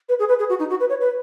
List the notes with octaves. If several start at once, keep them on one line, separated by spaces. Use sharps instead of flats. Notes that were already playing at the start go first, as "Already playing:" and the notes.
B4
G#4
B4
G#4
F#4
D#4
F#4
B4
C#5
B4